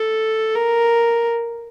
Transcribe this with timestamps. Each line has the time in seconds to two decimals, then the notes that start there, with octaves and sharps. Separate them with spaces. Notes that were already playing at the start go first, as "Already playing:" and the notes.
Already playing: A4
0.55 A#4